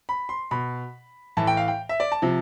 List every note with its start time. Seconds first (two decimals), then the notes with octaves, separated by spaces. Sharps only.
0.09 B5
0.29 C6
0.51 B2 B5
1.37 A2 E3 A5
1.47 G5
1.57 F5
1.68 G5
1.89 E5
2.00 D5
2.12 A5
2.22 C3 F3